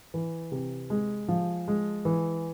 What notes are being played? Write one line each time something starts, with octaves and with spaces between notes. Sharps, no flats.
E3
C3
G#3
F3
G#3
E3